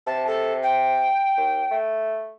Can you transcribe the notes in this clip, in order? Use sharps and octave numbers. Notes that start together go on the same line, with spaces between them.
C3 A5
A4
G5
D#2
A3